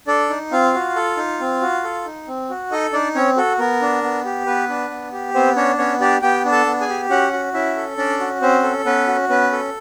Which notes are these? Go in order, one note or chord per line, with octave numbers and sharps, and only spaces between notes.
D4 A4 D5
D#4
C4 F4 F5
F#4
A4
D#4
C4
F#4
A4
D#4
C4
F#4
D#4 A4 D#5
D4 D#4 D5
C4 C#4 C#5
F#4 A4
B3 A#4
D4
B3
G4
B3 B4
D4
B3
G4
B3 C4 C5
C#4 D4 C#5
B3 C#4 C#5
D4 G4 D5
B3 G4 G5
D4
A4 A5
B3
G#4 G#5
G4
C#4 F#4 F#5
F#4
C#4 E4 E5
A4
C#4 D4 D5
F#4
C4 C#4 C5
A4
B3 C#4 B4
F#4
B3 C#4 B4
A4